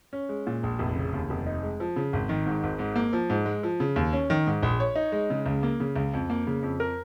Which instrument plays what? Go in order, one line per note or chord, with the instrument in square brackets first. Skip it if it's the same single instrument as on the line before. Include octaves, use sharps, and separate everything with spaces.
[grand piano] C#4
G#3
A#2
A#1
F1
C#3
D#2
F1
D#4
G#3
F3
C#3
G#1
D#3
G#2
G#1
G#2
A#3
F3
G#2
G#3
F3
C#3
D#2
C#4
D#3
G#2
A#1
C#5
D#4
G#3
C#3
C#2
A#3
C#3
C#2
F2
A#3
C#3
F2
A#4